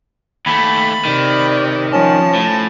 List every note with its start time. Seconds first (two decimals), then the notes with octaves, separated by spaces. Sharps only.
0.46 D#2 A3 B5
1.05 C3 D#3 D5
1.93 F3 C#4 A5
2.35 A2